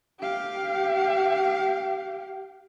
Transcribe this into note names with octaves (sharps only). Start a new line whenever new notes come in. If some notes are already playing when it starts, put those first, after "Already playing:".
G4 F5